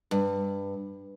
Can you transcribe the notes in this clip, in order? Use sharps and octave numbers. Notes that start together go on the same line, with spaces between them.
G2